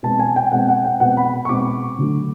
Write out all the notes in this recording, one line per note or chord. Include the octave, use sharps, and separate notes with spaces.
B2 G#3 C4 A5
G#5
G5
B2 G#3 C4 F#5
F#5
G5
B2 G#3 C4 F#5
B5
C#6
B2 G#3 C4 D6
D3 F#3 A3